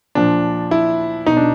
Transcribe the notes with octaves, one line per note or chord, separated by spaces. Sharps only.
A#2 F3 D4
E4
B2 D#4
D4